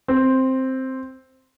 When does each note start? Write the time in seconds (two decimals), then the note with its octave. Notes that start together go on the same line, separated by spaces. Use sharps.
0.08 C4